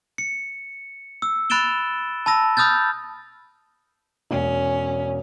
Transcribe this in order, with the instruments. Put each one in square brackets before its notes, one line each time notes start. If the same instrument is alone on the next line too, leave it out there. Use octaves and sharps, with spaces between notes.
[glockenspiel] C#7
E6
B5 F#6 A6 D7 E7 G7
A5 B5 E6 A#6
B5 D#6 F6 G6 A6
[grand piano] E1 [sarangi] C#4